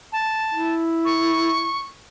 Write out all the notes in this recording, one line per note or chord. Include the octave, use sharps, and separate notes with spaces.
A5
E4
C#6